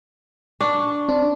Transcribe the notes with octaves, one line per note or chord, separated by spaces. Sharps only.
D4 C#6
C4 D4